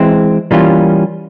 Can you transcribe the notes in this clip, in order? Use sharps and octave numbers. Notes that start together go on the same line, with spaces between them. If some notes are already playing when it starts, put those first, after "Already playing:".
Already playing: E3 G#3 C4
E3 G3 A#3 C#4 F4